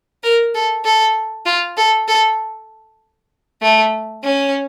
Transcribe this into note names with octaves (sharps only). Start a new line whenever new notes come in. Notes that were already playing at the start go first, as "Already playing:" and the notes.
A#4
A4
A4
F4
A4
A4
A3
C#4